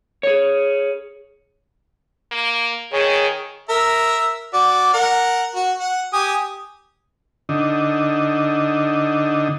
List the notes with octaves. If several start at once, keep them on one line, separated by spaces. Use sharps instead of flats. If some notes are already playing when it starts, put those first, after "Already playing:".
G#4 C#5
A#3
D#3 G#4 C#5
A#4 E5
F#4 D5
A#4 F#5
F#4
F#5
G4 G#5 D#6
D3 D#4